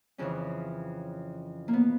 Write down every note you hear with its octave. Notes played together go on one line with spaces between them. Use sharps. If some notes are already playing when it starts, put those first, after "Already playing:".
F2 C#3 E3 C#4
A#3
B3